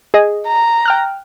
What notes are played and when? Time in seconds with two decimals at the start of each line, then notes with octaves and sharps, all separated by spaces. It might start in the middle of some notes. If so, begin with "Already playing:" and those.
0.14 G#4 D#5
0.47 A#5
0.86 G5 F6 F#6